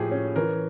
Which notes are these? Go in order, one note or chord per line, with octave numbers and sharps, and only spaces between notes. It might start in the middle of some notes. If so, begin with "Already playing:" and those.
Already playing: A2 F3 A#3 G4 G#4
C#4
E3 A#4